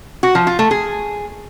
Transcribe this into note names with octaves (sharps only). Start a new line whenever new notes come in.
F#4
F3
F4
A3
G#4